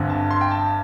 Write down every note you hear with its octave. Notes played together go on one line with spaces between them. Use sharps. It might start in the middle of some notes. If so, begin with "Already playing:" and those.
Already playing: G1 G2 D3 C4
A5
C6
G5
A5